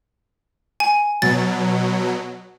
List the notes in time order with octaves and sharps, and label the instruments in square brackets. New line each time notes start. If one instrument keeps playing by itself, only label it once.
[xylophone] G#5
[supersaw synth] B2 F#3 [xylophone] A6